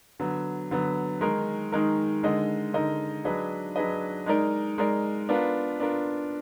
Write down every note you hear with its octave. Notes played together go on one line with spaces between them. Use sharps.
D3 F#3 B3
D3 F#3 B3
D#3 G#3 D#4 A#4
D#3 G#3 D#4 A#4
D3 G#3 D#4 A#4 D#5
D3 G#3 D#4 A#4 D#5
F#3 D4 G#4 B4 D#5
F#3 D4 G#4 B4 D#5
G#3 D#4 A#4 D5
G#3 D#4 A#4 D5
B3 D4 F4 A#4
B3 D4 F4 A#4